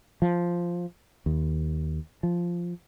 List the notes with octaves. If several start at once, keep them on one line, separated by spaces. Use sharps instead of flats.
F3
D#2
F3